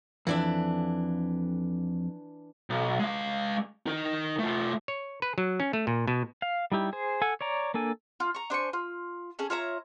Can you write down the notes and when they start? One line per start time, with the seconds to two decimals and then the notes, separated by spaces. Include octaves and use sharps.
0.27 F2 E3 D4 E5
2.70 B1
2.99 G#3 F5
3.86 D#4 A#4
4.39 A3 F4
4.88 C#5
5.22 B4
5.38 F#3
5.60 C#4
5.73 A3
5.87 A#2
6.07 B2
6.42 F5
6.72 G3 D#4 E4 G4
6.93 G#4 C5
7.22 A4 F#5 G#5
7.41 C#5 D5 A#5
7.74 A#3 D4 A4 G#5
8.20 F4
8.35 A#5 C#6
8.50 D4 C5 G#5 C#6
8.73 F4
9.39 C#4 G#4 A4
9.50 F4 C#5 E5 A#5